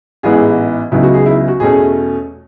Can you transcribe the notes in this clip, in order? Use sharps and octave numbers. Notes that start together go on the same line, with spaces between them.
A1 G#2 E3 B3 G#4
C#2 C#3 F#3 B3 D#4 E4
F#4
G#4
E4
F#4
E2 B2 A3 C#4 G#4